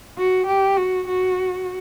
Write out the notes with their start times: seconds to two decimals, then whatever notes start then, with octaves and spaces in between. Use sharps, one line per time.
0.18 F#4
0.47 G4
0.77 F#4
1.08 F#4